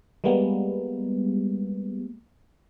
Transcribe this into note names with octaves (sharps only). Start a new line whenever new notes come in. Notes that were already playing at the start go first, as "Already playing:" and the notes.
G3 G#3 A#3 B3